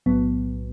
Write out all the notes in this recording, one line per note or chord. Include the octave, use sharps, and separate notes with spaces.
B1 A2 F#3 B3